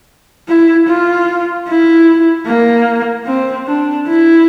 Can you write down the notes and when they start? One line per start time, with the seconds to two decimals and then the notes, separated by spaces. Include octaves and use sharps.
0.48 E4
0.87 F4
1.67 E4
2.46 A#3
3.26 C4
3.67 D4
4.07 E4